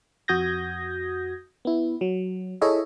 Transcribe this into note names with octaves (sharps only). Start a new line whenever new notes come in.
F2 F#4 D#6 G6 G#6 A#6
B3 E4
F#3
E4 G#4 A4 C#5 D#5 E5